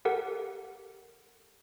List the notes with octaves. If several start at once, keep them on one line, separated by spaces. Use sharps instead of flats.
G4 A4 A#4 F#5